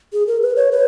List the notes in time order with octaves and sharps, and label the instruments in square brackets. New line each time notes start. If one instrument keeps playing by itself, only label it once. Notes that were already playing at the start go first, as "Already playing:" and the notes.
[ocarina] G#4
A#4
B4
C#5
B4